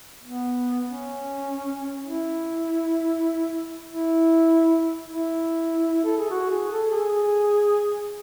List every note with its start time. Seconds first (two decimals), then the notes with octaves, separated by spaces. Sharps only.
0.24 B3
0.85 C#4
2.05 E4
3.87 E4
5.09 E4
6.05 A4
6.18 G#4
6.31 F#4
6.50 G#4
6.72 A4
6.91 G#4